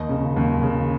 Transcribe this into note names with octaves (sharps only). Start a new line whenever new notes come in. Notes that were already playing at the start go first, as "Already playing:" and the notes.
Already playing: D#2 D#4
C#3
D#2
C#3